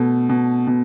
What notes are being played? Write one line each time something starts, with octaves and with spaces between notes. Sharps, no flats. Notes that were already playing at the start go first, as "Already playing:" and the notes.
Already playing: B2 A3
B2
B2